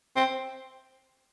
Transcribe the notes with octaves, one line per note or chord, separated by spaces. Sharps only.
C4